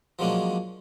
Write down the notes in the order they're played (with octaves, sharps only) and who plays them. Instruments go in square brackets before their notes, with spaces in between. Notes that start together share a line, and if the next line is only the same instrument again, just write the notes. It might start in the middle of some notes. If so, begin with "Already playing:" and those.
[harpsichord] F3 F#3 G#3 A#3 C#4 D4